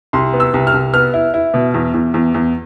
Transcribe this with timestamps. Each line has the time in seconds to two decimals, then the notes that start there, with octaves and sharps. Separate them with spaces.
0.13 C2 C6
0.33 B3
0.40 E6
0.54 C2
0.67 F6
0.74 C2
0.94 B3 F6
1.14 E4
1.34 E4
1.54 B2
1.74 E2
1.94 E2
2.14 E2
2.34 E2